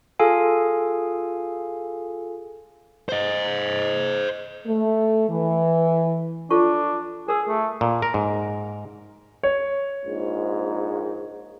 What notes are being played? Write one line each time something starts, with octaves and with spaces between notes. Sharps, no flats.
F4 G#4 A4 F5 G#5
C5 D#5
A3
E3
D4 F4 A4 C#6
G#4 A#4 E6
A3
A#2
A#4
G#2
C#5
A#1 G#2